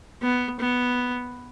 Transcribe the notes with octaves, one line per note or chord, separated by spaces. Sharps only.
B3
B3